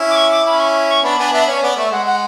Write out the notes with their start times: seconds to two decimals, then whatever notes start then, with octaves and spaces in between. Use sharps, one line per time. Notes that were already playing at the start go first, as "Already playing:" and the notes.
Already playing: C#4 E4
0.10 D6
0.16 C#6
0.31 D6
0.45 C#4 E4 B5
0.60 C#6
0.89 C#6
1.03 B3 D4 B5
1.18 B3 D4 G#5
1.32 B3 D4 E5
1.47 C#4 C#5
1.62 B3 D5
1.77 A3 E5
1.91 G#3 F#5
2.06 F#5